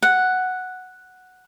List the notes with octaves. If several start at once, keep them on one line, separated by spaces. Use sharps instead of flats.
F#5